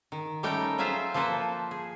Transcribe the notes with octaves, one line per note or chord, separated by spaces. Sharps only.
D#3
G3 A3 C#4 D#4 A#4 G5
F#3 F4 G#4 C5 E5 F5
F3 A#3 A4 B4 C5
G#4